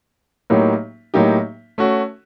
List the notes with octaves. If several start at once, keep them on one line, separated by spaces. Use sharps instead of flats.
A2 F#3 A#3 D#4 G4
A2 F#3 A#3 D#4 G4
A3 C#4 F#4